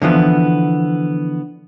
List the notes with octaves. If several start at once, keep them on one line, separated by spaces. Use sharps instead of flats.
D3 E3 F3 B3